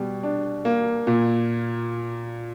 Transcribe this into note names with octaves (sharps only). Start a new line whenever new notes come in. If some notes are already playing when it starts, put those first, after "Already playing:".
Already playing: B2 G3
D4
A#3
A#2